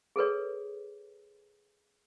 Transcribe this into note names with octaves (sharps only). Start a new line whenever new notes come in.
G#4 A4 B4 C#5